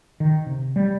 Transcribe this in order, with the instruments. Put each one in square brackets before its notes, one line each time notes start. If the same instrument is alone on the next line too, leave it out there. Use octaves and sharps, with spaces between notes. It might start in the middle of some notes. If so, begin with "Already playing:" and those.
[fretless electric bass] D#3
C3
G3